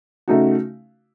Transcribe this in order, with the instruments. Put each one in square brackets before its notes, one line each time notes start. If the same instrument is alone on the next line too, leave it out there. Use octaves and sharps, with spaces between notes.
[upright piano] C#3 A3 D#4 F#4